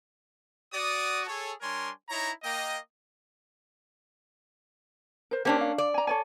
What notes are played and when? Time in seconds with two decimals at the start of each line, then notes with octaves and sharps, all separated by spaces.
0.73 F#4 D5 D#6
1.27 G#4 A4 C#5
1.61 G3 D4 A#4 C#5 G#5 C6
2.09 D#4 E4 C#5 A#5
2.42 A#3 D#5 G5
5.31 A#4 C5
5.45 A#3 C#4 D4 G4 C5 A5
5.61 F5
5.78 D5
5.94 G#5 A#5
6.07 A4 C#5 G#5